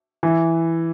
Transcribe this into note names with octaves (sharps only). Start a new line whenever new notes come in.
E3